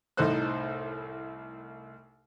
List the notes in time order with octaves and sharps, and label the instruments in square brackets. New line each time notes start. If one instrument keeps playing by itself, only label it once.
[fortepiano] C2 A2 D#4 A4 C5 F#6